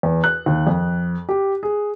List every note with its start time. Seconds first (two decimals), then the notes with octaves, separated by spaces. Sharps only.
0.03 E2
0.24 F#6
0.46 D#2
0.67 F2
1.29 G4
1.63 G#4